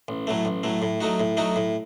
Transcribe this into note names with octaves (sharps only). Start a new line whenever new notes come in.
A1
A2 F#3 A3
A1
A2 F#3 A3
A2
F#3 A3 D#4 F#4
A2
F#3 A3 D#4 F#4
A2